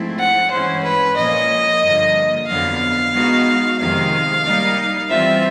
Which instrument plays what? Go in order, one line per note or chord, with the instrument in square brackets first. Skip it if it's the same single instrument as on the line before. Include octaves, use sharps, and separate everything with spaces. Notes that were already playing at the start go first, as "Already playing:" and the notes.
Already playing: [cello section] G#2 F3 A3 C4 E4
[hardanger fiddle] F#5
[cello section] G2 E3 G#3 C#4 E4 [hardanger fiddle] C5
[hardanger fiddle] B4
[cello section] A#2 F3 A#3 C#4 [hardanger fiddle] D#5
[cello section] G2 D3 F3 A#3
[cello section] F2 D3 F#3 B3 [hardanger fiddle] F5
[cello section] G#3 B3 D#4 F#4
[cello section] F2 C3 D#3 G#3 [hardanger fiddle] F5
[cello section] G3 A#3 D#4
[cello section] E3 G3 C4 F4 [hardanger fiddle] E5